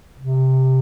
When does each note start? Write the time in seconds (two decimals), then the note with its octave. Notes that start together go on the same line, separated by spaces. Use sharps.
0.19 C3